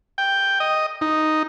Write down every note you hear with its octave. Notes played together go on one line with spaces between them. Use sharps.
G5
D#5
D#4